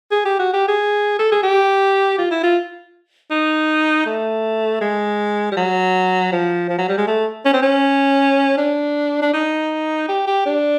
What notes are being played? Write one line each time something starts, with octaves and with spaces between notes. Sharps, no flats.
G#4
G4
F#4
G4
G#4
A4
G#4
G4
F4
E4
F4
D#4
A3
G#3
G3
F#3
F3
F3
F#3
G3
G#3
A3
C#4
C4
C#4
D4
D4
D#4
G4
G4
D4